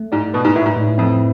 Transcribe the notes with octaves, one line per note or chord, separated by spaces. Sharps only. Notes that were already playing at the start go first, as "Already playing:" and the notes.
Already playing: A3
G#2 D5
B2 B4
G#2
A2 E4
G#2
A2
F2 C4